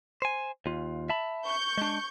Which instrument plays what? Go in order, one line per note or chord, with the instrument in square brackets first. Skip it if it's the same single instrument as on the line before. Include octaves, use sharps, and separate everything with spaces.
[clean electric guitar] C5 G#5
D#2 F4
E5 A5 B5
[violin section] C#6 G6
[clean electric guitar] G#3 D4